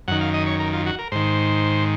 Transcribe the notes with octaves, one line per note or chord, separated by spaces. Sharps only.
F#2 D#3 F#5
F5
D#5
C#5
A#4
F4
F#4
A#4
G#2 D#3 C5